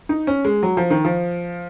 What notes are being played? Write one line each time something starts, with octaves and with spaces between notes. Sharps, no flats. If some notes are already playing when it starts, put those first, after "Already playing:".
D#4
C#4
G#3
F#3
F3
D#3
F3